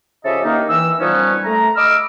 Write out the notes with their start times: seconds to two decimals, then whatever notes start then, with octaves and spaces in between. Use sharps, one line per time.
0.24 C#3 F3 G4 A4 D#5 E5
0.44 D#3 A#3 D#4
0.69 E3 E6
0.99 A#2 F3 G3 B3 C#4 D#4
1.44 A3 A#5
1.75 D#5 B5 D6 E6 F6